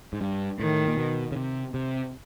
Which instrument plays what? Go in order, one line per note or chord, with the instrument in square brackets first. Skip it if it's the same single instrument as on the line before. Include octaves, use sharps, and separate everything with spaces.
[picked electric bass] G#2
G2
[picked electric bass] A2 [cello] D#3
[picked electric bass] A#2
B2
C#3
C3
C3